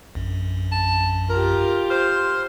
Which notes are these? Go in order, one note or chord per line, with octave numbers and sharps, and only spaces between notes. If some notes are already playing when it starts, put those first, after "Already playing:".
A#1 F#2
A5
F4 G4 A#4
C5 C6 F6